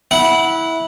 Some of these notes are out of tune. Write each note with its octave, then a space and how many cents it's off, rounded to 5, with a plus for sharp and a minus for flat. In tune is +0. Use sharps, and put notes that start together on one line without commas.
E4 -15 F#5 +0